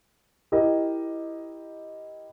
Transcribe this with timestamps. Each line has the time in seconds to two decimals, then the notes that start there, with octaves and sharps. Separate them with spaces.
0.52 E4 G4 A#4 D#5